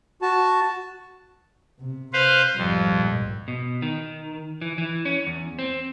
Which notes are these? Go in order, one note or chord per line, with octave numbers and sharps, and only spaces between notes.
F#4 A5
C3
C3 B4 C5 F5
G#1 F2 G3
A#1 G#2
B2
D#3
E3
E3
C#4
E2
C4